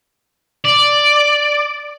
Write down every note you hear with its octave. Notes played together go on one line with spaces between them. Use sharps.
D5